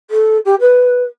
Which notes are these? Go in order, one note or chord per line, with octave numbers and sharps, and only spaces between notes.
A4
G4
B4